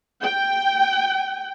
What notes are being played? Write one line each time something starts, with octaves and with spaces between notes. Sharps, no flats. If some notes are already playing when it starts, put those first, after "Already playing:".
G5